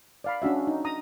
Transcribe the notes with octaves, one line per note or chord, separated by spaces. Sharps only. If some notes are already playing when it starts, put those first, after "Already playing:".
D5 F5 B5
C#4 D4 F#4 E5
D#4
A#5 D#6